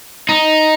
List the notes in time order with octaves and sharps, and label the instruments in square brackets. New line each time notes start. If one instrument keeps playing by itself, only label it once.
[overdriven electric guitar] D#4